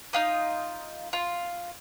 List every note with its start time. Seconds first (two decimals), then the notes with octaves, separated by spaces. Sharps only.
0.13 D#4 F4 D#6
1.13 F4